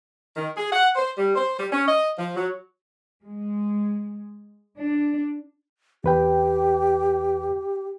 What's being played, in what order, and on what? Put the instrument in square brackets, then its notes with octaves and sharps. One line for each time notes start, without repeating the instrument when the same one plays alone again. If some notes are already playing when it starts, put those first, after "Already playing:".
[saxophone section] D#3
G#4
F#5
C5
G3
C5
G3
C#4
D#5
F3
F#3
[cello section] G#3
D4
[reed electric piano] E2 B4 G5 [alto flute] G4